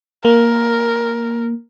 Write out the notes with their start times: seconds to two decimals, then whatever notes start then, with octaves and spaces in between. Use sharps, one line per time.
0.25 A#3 A#4